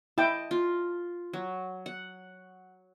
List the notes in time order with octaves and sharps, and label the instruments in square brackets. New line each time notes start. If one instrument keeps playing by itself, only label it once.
[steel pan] E4 G5 [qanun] D#5 A5
[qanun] F4
F#3
F#5